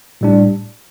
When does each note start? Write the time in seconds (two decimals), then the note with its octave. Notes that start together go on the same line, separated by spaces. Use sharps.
0.21 A2 G3 D4